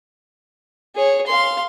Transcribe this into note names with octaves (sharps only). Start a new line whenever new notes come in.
G#4 C#5
F5 C6